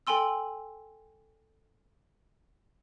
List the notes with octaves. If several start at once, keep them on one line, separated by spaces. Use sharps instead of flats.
A4 G5 G#5 C6 E6